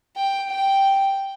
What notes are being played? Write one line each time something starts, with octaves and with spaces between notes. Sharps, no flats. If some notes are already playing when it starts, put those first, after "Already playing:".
G5
G5